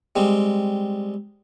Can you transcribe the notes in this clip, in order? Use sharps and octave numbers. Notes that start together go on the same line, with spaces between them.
G3 G#3 C4